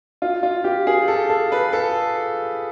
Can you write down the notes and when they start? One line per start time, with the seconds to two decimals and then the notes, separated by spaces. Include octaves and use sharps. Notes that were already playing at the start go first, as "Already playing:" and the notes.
0.22 F4
0.43 F4
0.64 G4
0.87 G#4
1.08 A4
1.29 A4
1.52 B4
1.73 A4